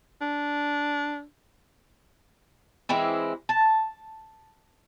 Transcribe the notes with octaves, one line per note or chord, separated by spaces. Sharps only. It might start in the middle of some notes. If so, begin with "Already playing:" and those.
D4
E3 G#3 C4 E4
A5